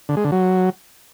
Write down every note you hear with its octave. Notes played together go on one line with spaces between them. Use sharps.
D3
G#3
D3
F#3